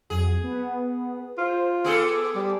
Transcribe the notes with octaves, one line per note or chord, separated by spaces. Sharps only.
F2 F#3 G#4
B3
F4 C5
B3 G#4 A4 D6
G3